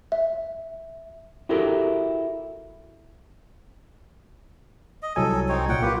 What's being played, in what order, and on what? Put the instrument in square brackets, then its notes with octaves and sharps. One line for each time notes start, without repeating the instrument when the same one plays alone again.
[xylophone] E5
[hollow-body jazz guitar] E4 F#4 G4 A4 A#4
[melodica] D#5
[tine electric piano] C2 F#3 G#5 [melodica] A4
[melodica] C4 D#4 C#5
[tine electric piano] B1 A#2 [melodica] F#5 G5
[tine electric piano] A#3 F4 [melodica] G4 B4